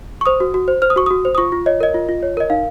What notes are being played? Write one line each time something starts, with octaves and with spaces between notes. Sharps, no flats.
C#6
C5 D#6
F#4
F#4
C5
C5 F6
D#6
F#4 C#6
F#4 D#6
C5
D#6
F4 C#6
F4
C#5 D#5
A#4 D#5
F4
F4
C#5
A#4 D#5
D#4 F5